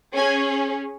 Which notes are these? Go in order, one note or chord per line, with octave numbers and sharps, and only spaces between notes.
C#4 G#4 G#5